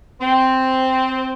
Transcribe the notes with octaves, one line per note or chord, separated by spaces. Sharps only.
C4